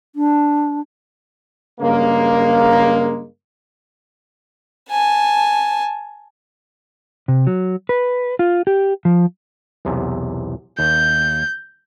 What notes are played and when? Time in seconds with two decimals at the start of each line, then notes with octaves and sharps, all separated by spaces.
0.16 D4
1.81 G2 C#3 G#3 A#3
4.90 G#5 A5
7.28 C3
7.47 F#3
7.89 B4
8.39 F4
8.67 G4
9.05 F3
9.85 B1 E2 C3
10.79 D#2 G6